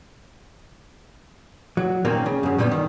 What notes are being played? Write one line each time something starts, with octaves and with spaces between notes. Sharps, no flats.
F#3
A#2 D#3 A#3 C4 C#4
C#3
F#2 C#3
A#2 D3 G3 A3 B3
D#3